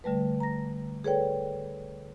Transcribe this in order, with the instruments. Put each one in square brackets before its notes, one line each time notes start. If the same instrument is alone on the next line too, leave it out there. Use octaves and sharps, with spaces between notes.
[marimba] D3 G3 A3 B4
A#5 A#6
G#4 A4 B4 C#5 D5 G5